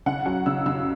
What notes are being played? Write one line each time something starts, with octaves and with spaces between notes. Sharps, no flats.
C#3 F#5
F#3 F#5
C#3 E6
C#3 E6